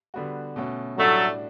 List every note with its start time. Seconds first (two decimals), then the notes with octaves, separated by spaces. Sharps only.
0.14 D3 G3 B3 F#4
0.56 B2 A3 C#4 F#4
0.98 A2 F#3 G3 A3 D4 F#4